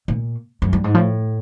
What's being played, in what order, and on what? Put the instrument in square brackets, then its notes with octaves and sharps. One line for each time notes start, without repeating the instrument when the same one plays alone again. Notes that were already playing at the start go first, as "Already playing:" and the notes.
[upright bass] A#2
F#2
G2
G#2
[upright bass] A2 [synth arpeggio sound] F3